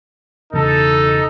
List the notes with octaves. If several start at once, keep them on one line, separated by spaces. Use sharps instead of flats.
E1 C#3 D#4 A4